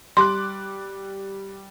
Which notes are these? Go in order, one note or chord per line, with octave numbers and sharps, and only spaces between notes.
G3 C6 D6 F#6